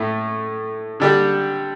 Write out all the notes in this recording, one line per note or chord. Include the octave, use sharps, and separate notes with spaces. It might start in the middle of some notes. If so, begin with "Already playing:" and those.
Already playing: A2 A3
D3 G3 D4 G4